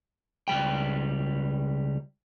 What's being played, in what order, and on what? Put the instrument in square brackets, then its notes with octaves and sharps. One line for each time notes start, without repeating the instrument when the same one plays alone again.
[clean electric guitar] C#2 G3 G5